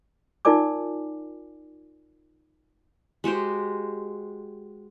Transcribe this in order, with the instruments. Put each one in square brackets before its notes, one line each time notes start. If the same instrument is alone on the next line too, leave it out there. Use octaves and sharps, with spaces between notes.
[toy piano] D#4 F4 A#4 D5 G#5 D6
[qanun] G#3 F#4 G4 C5